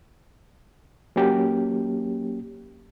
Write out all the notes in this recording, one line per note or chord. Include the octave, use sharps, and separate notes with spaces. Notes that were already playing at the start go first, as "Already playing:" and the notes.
F#3 A#3 C#4 G4